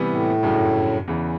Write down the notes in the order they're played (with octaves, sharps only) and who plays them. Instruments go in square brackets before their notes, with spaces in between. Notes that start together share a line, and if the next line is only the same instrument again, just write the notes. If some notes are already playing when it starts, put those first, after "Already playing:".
Already playing: [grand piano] C3 E3 G3 B3
[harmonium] A2
[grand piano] G1 F#2 C#3
E2 C#3 E3